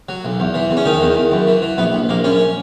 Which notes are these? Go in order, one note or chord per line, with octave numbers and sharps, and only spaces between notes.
F#3
B1
E2
E3
E2
C#4
D#3 D#4
E2
E2
F#2
E3
E3
A#1 B3
A#1
A#1 A#3
F#2 C#4